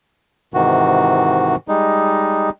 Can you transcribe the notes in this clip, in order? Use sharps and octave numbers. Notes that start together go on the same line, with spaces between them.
G#2 C3 D#3 E3 F#4
G3 G#3 D#4